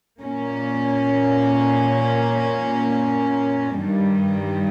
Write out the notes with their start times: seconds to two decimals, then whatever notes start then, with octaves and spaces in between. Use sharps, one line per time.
0.20 A#2 A#3 C#4
3.76 G2 D#3 G3